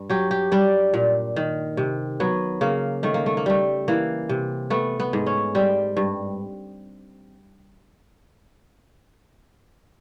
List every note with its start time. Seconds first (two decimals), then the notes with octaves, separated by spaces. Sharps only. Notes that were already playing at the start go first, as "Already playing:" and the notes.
Already playing: G2
0.10 F#3 G4
0.31 G4
0.52 G3 D4
0.94 A#2
1.36 D#3
1.77 C3
2.20 F#3 B3
2.61 C#3 A#3
3.03 D#3 A3
3.14 A#3
3.26 A3
3.37 A#3
3.46 G3 A3
3.88 E3 A#3
4.29 C3
4.70 A3 B3
5.00 B3
5.13 G#2
5.26 C#4
5.55 G3 C4
5.97 G2